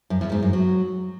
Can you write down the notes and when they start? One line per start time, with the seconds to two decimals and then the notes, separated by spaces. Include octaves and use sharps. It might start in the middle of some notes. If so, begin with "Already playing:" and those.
0.10 F#2
0.21 E2
0.32 G#2
0.42 F#2
0.53 F#3